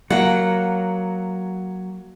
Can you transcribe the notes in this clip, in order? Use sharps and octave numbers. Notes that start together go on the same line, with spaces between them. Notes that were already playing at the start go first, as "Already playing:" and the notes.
F#3 A#3 F#5